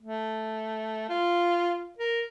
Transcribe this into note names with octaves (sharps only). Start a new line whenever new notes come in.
A3
F4
A#4